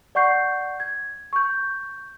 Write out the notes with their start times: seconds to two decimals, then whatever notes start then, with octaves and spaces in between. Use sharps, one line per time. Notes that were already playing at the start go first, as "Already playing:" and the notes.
0.15 D5 F#5 C#6 G6 C7
0.80 G#6
1.33 C#6 G6